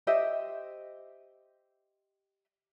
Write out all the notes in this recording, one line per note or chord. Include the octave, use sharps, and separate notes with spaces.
G4 C5 D#5 E5